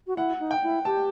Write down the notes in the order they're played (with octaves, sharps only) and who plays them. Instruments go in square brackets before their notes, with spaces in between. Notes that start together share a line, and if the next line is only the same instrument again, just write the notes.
[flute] F#4
[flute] E4 [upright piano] F#5
[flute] D#4
[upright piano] G5
[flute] E4
[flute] G4 [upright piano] A5